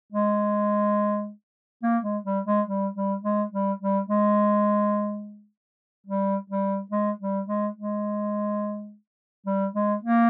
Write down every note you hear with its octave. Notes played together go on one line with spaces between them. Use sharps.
G#3
A#3
G#3
G3
G#3
G3
G3
G#3
G3
G3
G#3
G3
G3
G#3
G3
G#3
G#3
G3
G#3
A#3